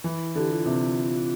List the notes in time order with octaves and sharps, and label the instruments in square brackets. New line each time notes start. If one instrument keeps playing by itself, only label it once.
[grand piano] E3 [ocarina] E4
[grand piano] D3 [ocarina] G4
[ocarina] F4
[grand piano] C3